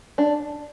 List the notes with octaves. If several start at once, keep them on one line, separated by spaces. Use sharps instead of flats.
D4